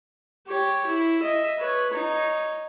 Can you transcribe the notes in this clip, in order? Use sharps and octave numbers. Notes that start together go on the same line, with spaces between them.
G4 C#5
E4
D#5 E5
B4 C#5
D#4 C#5